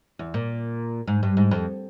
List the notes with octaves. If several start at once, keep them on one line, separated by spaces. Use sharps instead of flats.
E2
A#2
G#2
G2
G#2
F2